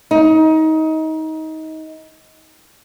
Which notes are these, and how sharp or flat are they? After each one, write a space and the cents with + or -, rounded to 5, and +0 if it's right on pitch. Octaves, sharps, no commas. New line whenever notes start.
D#4 +25